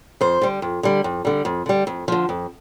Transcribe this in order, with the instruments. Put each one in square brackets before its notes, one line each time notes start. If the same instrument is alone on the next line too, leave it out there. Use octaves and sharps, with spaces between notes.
[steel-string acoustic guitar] F2 C5
D3 G3
F2
D3 G3
F2
D3 G3
F2
D3 G3
F2
D3 F3
F2